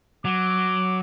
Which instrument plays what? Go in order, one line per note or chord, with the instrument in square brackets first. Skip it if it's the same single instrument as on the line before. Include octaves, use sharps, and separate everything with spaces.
[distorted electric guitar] F#3 [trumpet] D6